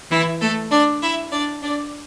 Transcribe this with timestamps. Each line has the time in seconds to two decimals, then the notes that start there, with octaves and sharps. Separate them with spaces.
0.10 E3 E4
0.40 A3 A4
0.71 D4 D5
1.01 E4 E5
1.31 D4 D5
1.62 D4 D5